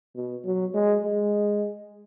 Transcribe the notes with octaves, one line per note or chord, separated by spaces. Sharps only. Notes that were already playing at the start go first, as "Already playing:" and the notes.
B2
F#3
G#3
G#3